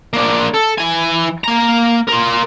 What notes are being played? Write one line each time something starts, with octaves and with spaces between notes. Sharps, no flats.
A#3 D4
A4
E3 G#5
A#3 A#5
F4 A#4